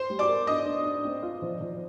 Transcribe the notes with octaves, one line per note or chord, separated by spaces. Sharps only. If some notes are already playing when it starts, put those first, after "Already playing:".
Already playing: C5 C6
G3
D5 D6
A#4
D4 D#5 D#6
D4
D4
C4
F4
F3
F3